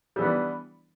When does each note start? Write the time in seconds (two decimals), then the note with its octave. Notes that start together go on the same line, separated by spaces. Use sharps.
0.16 G3
0.19 E3
0.22 B3
0.24 D4